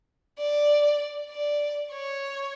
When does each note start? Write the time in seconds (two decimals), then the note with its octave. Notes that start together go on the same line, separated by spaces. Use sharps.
0.39 D5
1.30 D5
1.92 C#5